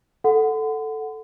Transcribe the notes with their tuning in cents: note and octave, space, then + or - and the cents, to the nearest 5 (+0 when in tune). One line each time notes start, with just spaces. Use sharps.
A4 +0 F#5 +0 C6 -45